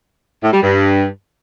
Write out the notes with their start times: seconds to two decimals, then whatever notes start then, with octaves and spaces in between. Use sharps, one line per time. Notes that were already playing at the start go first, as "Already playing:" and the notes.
0.43 A2
0.53 G3
0.62 G2